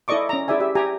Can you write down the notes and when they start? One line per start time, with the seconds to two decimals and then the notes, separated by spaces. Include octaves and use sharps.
0.08 E4 A4 D5 D#5 C#6 D6
0.29 C#4 A#5
0.48 E4 G#4 D5 E5 G#5
0.60 G4 E5
0.75 G4 G#5 A#5